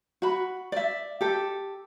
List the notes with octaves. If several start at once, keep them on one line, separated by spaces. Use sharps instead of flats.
F#4 B5
D5 E5
G4 A4